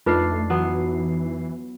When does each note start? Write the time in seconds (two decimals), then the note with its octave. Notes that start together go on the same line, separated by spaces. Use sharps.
0.06 F2 A3 D4 D#4 F4 B4 C7
0.50 E3 F#3 B3